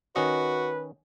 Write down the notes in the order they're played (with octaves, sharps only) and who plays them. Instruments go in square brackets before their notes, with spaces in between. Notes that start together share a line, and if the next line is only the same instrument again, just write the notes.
[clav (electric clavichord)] D#3 C#4 D#5 [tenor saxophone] F#4 [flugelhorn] B4